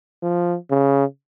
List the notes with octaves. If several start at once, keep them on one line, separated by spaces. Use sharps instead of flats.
F3
C#3